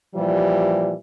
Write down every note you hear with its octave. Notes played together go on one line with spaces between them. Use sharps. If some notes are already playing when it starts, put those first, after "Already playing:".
A#2 E3 F3 G3